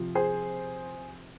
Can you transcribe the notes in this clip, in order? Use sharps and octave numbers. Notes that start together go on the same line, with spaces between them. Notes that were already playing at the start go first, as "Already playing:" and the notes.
Already playing: C3 F3 C4
G#4 C5